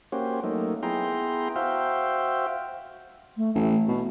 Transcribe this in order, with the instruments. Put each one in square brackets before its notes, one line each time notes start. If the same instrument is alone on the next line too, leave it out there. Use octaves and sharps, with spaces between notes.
[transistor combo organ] A#3 C#4 F#4 G4 C5
F#3 A3 A#3 D#4
B3 E4 G#4 G5 A#5 C6
F#4 C5 E5 F5 G5
[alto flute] A3
[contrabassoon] A1 [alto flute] A3
[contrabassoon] B2